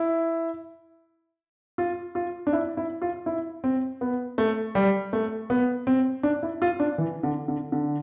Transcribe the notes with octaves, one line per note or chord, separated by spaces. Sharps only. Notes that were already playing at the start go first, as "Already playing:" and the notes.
Already playing: E4
F4
F4
D4
E4
E4
F4
E4
C4
B3
A3
G3
A3
B3
C4
D4
E4
F4
D4
E3
D3
D3
D3